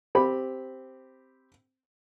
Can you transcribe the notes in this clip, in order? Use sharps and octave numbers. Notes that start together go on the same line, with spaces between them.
C4 G4 B5